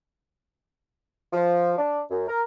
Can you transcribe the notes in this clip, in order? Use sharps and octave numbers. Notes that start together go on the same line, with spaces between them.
F3
D4
F#2
A#4